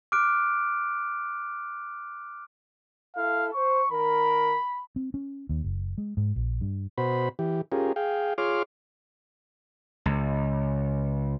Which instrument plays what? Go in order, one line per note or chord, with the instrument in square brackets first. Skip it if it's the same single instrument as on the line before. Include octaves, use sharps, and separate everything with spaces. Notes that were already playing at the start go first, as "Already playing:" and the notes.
[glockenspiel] D6 F6 F#6 D7
[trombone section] E4 A4 [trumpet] F5
[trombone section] C5 [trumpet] C#6
[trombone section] D#3 A#4 [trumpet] B5
[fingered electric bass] C4
C#4
D#2
F#1
G#3
G#2
A#1
G2
[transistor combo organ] B2 F#4 C5 B5
E3 G4
C#4 F4 G4 G#4 A#4
G#4 F5 G5
F4 G#4 C#5 C6 D6 F6
[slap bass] C#2